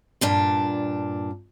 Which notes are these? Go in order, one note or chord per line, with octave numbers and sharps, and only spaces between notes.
G2 A#2 D4